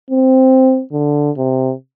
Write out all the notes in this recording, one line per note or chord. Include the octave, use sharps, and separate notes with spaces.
C4
D3
C3